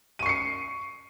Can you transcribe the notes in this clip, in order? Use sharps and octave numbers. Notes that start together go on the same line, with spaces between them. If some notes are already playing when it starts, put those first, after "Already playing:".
C#6 C7 C#7 D#7